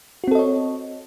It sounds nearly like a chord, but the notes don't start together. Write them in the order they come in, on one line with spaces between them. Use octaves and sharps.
F#4 C4 A4 D#5 C#5